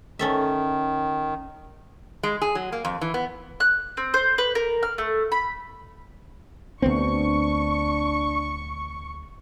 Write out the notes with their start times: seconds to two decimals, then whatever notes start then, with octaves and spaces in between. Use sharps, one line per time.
0.19 D#3 C#4 A4 E5
2.23 G#3
2.42 G#4
2.55 F#3
2.72 A#3
2.85 F2
3.01 E3
3.14 B3
3.60 F#6
3.97 C4
4.14 C5
4.38 B4
4.55 A#4
4.83 F6
4.98 A3
5.32 B5
6.82 D2 B3 C4 D4 C#6